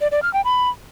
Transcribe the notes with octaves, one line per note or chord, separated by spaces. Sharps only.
D5
D5
F6
G5
B5